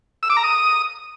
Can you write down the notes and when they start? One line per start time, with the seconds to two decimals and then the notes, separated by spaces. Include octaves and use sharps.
0.23 E6
0.30 D6
0.37 A#5
0.44 D#6